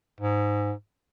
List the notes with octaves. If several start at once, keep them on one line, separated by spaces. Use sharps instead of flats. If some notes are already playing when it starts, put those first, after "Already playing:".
G#2